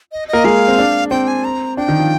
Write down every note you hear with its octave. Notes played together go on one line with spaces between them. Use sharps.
D#5
D#5
A#3 A#4
G#3 G#4 F5
C4
D4
C4 G5
G#5
A#5
D4 G5
D#3 D#4
F3 F4